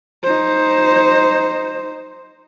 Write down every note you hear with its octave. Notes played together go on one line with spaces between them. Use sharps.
D#4 C5